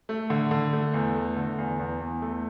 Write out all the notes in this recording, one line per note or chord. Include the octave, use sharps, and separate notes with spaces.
A3
D3
D3
A3
E2
A3
D3
E2
E2
E2
A3